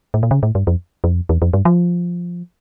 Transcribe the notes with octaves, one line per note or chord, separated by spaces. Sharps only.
A2
A#2
C#3
A2
G2
F2
F2
E2
F2
G2
F3